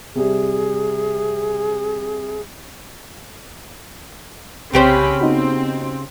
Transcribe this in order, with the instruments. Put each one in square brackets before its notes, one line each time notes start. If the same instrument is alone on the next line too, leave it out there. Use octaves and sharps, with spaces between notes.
[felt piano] C3 G3 [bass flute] G#4
[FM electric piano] C2 [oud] C#3 G4 C5 [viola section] C4 C#4 B5
[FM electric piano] B3 D#4 F#4 [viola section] C4